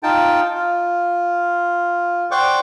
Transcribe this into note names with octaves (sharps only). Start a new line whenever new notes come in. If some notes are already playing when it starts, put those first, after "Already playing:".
D#4 F4 G5 A5
F4
C5 D5 F#5 G5 C#6 D6